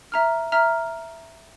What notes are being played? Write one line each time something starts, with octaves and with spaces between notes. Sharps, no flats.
E5 A#5 F6
E5 A#5 F6